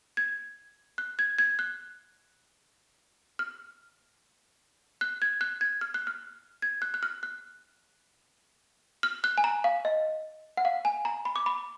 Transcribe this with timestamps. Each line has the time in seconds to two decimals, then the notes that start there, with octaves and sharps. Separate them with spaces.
0.17 G#6
0.98 F#6
1.19 G#6
1.38 G#6
1.59 F#6
3.39 F6
5.01 F#6
5.22 G#6
5.41 F#6
5.61 G#6
5.81 F6
5.94 F#6
6.07 F6
6.62 G#6
6.82 F#6
6.94 F#6
7.03 F6
7.23 F#6
9.03 F6
9.24 F#6
9.38 G#5
9.44 A#5
9.64 F5
9.85 D#5
10.57 F#5
10.65 F5
10.85 G#5
11.05 A#5
11.25 B5
11.36 D6
11.46 B5